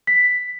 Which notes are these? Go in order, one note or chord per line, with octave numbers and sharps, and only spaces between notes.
B6